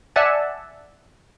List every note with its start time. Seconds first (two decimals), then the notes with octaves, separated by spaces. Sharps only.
0.16 D5 E5 F#5 G#5 A5